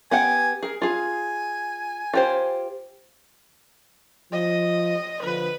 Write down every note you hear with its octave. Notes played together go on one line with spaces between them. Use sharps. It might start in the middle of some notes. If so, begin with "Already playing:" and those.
B3 G4 F#5 G#5
G#4 A#4
F4 G#4 G#5
F4 G4 C5
F3 D#5
D3 F3 B4